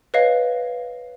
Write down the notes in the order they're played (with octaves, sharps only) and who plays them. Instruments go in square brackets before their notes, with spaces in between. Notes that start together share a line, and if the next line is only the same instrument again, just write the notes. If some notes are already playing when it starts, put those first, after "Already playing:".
[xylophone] B4 C#5 D#5 F5